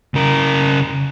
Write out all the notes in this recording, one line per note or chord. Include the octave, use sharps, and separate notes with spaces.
C#3 A#4